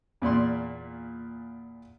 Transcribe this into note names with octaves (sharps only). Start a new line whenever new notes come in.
E2 A#2 D5 C6